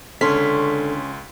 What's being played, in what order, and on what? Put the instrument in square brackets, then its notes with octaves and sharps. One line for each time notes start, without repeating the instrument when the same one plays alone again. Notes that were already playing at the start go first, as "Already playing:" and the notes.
[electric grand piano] C#2 C6 B6 [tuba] D3 [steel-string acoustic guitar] C#4 [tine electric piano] A4